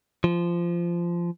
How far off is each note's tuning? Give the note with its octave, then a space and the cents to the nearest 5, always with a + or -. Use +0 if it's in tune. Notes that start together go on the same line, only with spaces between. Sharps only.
F3 -15